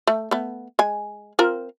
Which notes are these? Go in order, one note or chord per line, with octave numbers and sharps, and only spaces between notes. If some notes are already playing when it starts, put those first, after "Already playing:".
A3
A3 B3
G#3 G#5
C4 F4 A#4